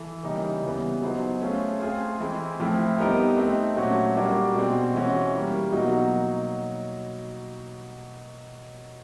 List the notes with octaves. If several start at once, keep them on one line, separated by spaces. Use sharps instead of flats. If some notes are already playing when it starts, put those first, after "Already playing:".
Already playing: E3 A4
C#3 E3 G3 A#3 D#4
C#3 E3 G3 B3
F#3 B3 D#4 G#4 C5
A3 C#4 F4 G#4
A3 C4 F4 G#4 C5
E3 G#3 C4 E4
A2 F3 A3 C4 E4
G3 B3 D#4 G4 A#4
A3 C4 D#4
A#2 F#3 A3 C#4 F#4
G3 A#3 D4 F#4
B2 G#3 C4
E3 G#3 C#4 F#4
E3 G3 A#3
B2 F#3 A#3 D#4 F#4